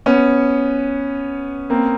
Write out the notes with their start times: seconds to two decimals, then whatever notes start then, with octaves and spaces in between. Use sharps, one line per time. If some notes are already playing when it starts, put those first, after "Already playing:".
0.06 B3 C#4
1.70 A#3 C4